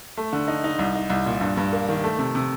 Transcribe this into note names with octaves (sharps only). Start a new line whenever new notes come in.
A3
D3
D#4
D#4
C2
D#4
C2
A#2
G2
G2
A#3
D#3
A3
C3
C3